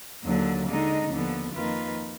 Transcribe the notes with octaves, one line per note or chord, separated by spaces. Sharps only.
D#2 D3 F#3
D3 G#3 D#4
D#2 D3 F3 B3
F2 D#3 A#3 F4 B4